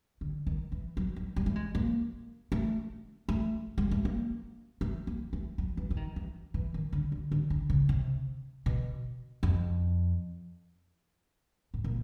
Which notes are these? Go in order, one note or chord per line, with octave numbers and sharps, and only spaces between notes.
D3
D#3
E3
F#3
F#3
G3
A3
G#3
A#3
A3
A3
G#3
A3
A#3
A3
A#3
A3
F#3
E3
E3
D#3
E3
E3
D#3
D3
D3
D3
D3
C#3
C3
B2
F2
A2
A#2